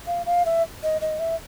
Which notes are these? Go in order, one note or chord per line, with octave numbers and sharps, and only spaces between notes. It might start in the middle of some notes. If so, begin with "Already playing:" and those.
F5
F5
E5
D#5
D#5
E5